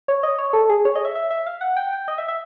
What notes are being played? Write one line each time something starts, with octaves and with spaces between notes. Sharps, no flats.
C#5
D#5
C#5
A4
G#4
C#5
D#5
E5
E5
E5
F5
F#5
G5
G5
D#5
E5
E5